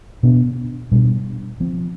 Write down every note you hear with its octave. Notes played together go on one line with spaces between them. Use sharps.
B2 B3 D4
B2 G3 D4
F3 C4